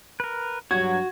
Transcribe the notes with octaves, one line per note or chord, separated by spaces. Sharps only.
A#4 B4
G2 F#3 F#4 C#5 G#6